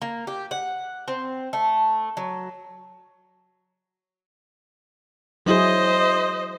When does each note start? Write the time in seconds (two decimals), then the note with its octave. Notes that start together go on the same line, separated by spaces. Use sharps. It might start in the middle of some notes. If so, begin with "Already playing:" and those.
0.02 A#3
0.27 G4
0.51 F#5
1.08 C4
1.53 A3
2.17 F#3
5.46 F#3 E4 G#4 C5 D#5